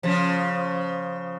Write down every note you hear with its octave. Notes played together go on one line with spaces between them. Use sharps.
C#3 F3